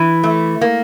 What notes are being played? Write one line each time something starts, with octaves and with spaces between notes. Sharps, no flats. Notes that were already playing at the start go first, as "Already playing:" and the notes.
Already playing: E3
A3
A#3